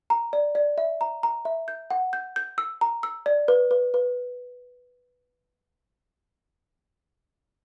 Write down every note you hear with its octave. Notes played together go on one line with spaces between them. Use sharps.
A#5
D5
D5
E5
A#5
A#5
E5
G6
F#5
G6
G6
E6
A#5
E6
D5
B4
B4
B4